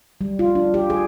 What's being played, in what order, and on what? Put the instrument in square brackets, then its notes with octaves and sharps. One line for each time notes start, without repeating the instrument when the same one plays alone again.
[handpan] G3
F4
D4
G4
G#4